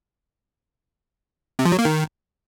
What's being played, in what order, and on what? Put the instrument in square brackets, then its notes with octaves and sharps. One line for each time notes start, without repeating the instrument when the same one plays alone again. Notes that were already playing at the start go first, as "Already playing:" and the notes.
[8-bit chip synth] C3
F3
F#3
A#3
D#3